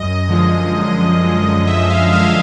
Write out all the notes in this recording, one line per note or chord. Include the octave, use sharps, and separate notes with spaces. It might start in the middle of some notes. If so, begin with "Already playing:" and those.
Already playing: F#2 D#5
D3 F3 G#3
F#2
D3 F3 G#3
F#2 E5
F5
D3 F3 G#3 F5